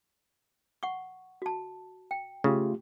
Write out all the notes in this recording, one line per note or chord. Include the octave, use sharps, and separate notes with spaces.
F#5 C#6
F#4 A5
G5
C#3 A3 F4 G4